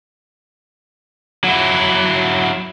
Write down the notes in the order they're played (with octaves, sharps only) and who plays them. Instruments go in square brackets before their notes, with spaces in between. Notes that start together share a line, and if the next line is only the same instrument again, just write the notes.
[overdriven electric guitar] F#3 E4